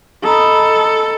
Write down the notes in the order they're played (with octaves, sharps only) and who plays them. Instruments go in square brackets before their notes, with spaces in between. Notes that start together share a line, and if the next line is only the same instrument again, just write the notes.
[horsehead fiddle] A4 [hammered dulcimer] D#5 A#5 B5